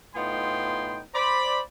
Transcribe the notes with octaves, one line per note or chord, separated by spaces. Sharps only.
A2 B3 D#4 F4 G5 C6
C5 D5 B5